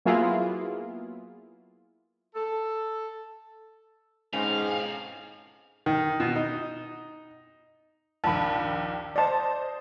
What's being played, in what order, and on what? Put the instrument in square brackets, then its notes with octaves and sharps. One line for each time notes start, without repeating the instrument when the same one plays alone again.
[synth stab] F#3 A#3 B3 E4 F4 G#4
[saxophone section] A4
[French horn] G#2 [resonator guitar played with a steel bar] B2 C4 C#4 [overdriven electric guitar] A4 G#5 [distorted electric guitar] F5
[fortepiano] D#3
B2
D#4
[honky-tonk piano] A#1 D#2 [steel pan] A5 B5
[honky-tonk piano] C5 D#5 [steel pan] D5 A5